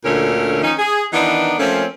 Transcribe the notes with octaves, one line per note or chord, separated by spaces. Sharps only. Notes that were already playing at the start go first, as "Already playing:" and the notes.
D2 A#2 D3 A3 C#4 A#4
D#3 F3 C#4 D#4
G#4
D#3 E3 B3 D4 D#4
F3 A3 A#3 C4 C#4